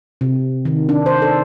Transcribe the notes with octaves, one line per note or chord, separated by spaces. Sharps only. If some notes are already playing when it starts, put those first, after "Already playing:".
C3
D#3
D4
C5
A4